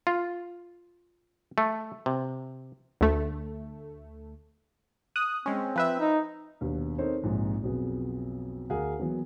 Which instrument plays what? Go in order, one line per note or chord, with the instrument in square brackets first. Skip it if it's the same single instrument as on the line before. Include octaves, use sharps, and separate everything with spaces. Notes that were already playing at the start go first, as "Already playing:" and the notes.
[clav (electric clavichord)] F4
A3
C3
[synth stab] D2 A3
D#6 F#6
[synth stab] G#3 C#4 [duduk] C4
[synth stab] F3 B4 E5
[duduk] D#4
[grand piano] D#2 B2 B3 D4
C4 D#4 A4 A#4 C5 C#5
A#1 G#2 C3
B1 F2 F#3 B3 G#4
D2 G#4 A#4 F5 F#5
E3 F#3 A#3 B3